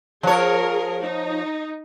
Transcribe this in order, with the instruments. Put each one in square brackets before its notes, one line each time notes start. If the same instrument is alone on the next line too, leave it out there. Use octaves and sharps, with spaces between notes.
[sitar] F3 C#5 [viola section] G#4 A#4
[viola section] D#4